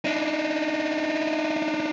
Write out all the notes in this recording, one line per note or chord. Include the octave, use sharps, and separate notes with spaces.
D4 D#4